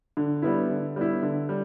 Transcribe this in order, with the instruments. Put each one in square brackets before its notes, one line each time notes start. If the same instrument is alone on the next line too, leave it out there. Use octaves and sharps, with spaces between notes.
[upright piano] D3
G3 B3 E4
D3
G3 B3 E4
D3
G3